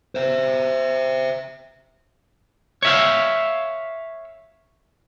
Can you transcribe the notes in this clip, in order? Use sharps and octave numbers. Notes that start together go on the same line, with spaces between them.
C5 E5
C#5 E5 F5